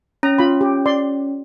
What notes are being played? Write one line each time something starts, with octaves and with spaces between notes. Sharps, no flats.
C#4 A#5
F4 B5
G4
D5 C6